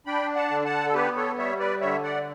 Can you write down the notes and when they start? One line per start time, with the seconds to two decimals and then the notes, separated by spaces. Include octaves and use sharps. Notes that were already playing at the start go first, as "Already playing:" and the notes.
0.06 D4 G5 B5
0.35 F#5 A5
0.50 D3
0.65 F#5 A5
0.86 A4
0.94 B3 G4 B4
1.16 A4 C#5
1.38 G3 C#5 E5
1.59 B4 D5
1.81 D3 C#5 E5
2.03 D5 F#5